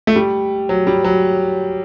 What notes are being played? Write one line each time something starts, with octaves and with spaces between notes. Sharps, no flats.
A3
G3
F#3
G3
F#3